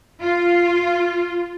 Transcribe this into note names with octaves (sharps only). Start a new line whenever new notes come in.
F4